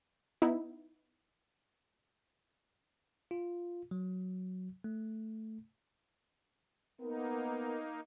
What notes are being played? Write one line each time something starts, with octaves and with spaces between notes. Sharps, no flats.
B3 D#4 E4
F4
F#3
A3
A#3 B3 D#4 A#4